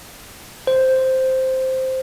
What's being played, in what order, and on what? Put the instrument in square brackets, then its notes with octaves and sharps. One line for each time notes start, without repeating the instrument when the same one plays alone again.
[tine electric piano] C5